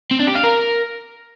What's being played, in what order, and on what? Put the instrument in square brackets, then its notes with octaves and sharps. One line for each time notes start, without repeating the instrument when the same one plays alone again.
[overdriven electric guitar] C4
D4
G4
F5
A#4